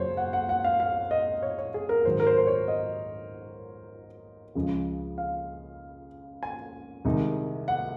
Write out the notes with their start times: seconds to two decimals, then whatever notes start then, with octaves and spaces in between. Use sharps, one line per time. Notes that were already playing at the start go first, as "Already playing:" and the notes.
Already playing: F#2 C#3 F#3 C5 C#5
0.17 F#5
0.33 F#5
0.49 F#5
0.64 F5
0.80 F5
1.11 D#5
1.43 C#5
1.58 C#5
1.74 G#4
1.89 A#4
2.05 G#2 D#3 F#3 C5
2.20 A#4
2.27 C5
2.38 C5
2.47 C#5
2.68 D#5
4.55 C#2 C#3 F3
5.18 F5
6.43 G#5
7.05 C2 C3 D#3 G#3 D#4
7.68 F#5